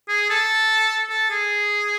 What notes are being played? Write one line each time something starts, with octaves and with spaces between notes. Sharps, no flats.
G#4
A4
A4
G#4